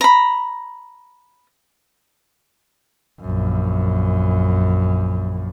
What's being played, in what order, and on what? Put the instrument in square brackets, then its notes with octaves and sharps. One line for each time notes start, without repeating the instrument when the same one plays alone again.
[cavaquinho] A#5 B5
[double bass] A#1 F#2